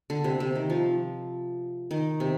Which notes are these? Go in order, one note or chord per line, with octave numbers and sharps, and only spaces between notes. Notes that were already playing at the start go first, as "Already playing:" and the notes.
D3
C3
C3
D#3
F3
D#3
C3